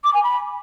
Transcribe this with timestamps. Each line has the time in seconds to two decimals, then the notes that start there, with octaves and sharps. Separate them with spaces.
0.04 D6
0.14 G#5
0.24 B5